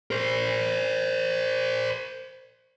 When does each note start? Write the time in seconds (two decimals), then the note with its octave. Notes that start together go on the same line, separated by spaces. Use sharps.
0.11 A#4 C5